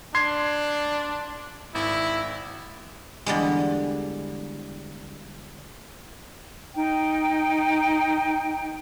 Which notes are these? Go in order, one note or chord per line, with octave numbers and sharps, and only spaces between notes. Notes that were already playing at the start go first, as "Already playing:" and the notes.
D4 C6 G#6 C7
G#1 E4
E2 D3 G3 G#3
D#4 G5